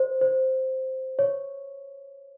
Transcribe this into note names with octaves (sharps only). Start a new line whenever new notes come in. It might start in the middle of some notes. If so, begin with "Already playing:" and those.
Already playing: C5
C5
C#5